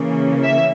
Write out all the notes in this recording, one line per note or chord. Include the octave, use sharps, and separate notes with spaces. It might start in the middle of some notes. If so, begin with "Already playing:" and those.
Already playing: C#3 E3 A#3 C#4
E5